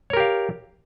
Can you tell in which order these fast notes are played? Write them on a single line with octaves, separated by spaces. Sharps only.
C#5 A#4 G4 F5